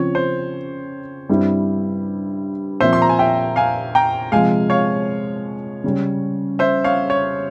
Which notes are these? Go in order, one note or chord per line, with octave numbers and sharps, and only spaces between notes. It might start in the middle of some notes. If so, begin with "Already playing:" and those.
Already playing: C#3 F3 C4 F4 C#5
C5
G2 G3 C4 E4 G4
A#2 F3 C4 F4 C5 E5
C6
A#5
G#5
E5 G5
F5 G#5
G5 A#5
C3 F3 G#3 F5 G#5
C#5 F5
C#3 G3 C#4 G4
C5 E5
C#5 F5
C#5